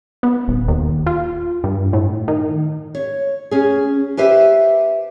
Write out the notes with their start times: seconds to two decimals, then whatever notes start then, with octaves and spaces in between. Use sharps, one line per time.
0.23 B3
0.48 D#1
0.68 D#2
1.06 F4
1.64 G2
1.93 A2
2.28 D#3
2.95 C#5
3.51 C#4 G#4
4.17 G4 B4 C5 E5